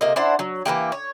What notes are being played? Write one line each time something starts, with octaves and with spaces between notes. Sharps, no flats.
C3 A#3 D#5
D4 E4 C5 F#5
F#3
E3 F#3 A#3 G4
C#5